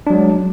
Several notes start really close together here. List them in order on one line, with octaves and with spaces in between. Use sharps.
D4 F#3 G#3